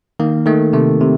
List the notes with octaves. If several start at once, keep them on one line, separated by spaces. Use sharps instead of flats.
D#3 A#3
D#3 A3
C3 A3
C3